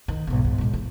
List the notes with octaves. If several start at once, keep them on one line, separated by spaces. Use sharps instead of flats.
D#3
B1 G#2
G#2
A2 G#3
E3